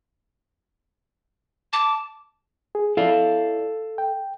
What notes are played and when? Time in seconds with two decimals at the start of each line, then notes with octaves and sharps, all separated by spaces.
1.73 A5 D6
2.75 G#4
2.97 E4 A4 D5 F5
3.98 G5